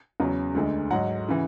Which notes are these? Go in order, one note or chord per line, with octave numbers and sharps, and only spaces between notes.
E2 C#3 F#3
D2 D3 G#3
G#2 F#3 F#5
C#3 E3